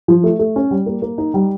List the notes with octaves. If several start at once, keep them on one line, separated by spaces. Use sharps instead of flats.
F3
A3
A3
C#4
G3
A#3
A#3
D#4
G3